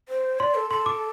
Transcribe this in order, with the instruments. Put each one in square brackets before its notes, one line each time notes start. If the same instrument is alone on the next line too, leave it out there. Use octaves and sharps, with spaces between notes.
[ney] C5
[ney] D5 [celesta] C6
[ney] A4
[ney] A4 [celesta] C6
[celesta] D6